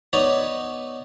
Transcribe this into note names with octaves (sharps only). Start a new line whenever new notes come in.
B3 D#4 C#5 D5 A#5 B5